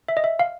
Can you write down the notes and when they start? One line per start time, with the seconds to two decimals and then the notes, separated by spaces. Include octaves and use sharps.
0.08 E5
0.17 D#5
0.24 E5
0.39 F5